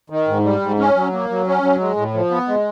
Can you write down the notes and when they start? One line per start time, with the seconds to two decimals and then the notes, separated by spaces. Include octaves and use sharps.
0.10 D#3
0.28 G#2
0.44 G3
0.61 G#2
0.79 C#4
0.96 F#3
1.12 A#3
1.29 F#3
1.47 C#4
1.62 F#3
1.79 G#3
1.97 A2
2.14 F3
2.31 B3
2.48 G#3